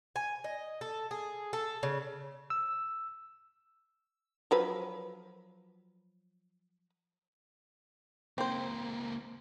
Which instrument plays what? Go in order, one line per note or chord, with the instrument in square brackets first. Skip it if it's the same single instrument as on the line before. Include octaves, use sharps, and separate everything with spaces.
[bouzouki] G#5
D#5
A4
G#4
A4
C#3
[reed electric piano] E6
[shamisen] F3 F#3 B4
[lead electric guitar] C#2 A#3 [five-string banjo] C4 C5